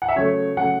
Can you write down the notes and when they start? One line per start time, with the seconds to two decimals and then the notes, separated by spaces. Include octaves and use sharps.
0.02 F#5
0.09 E5
0.16 C#3 F#3 A3 C#5
0.57 C#3 F#3 A3 F#5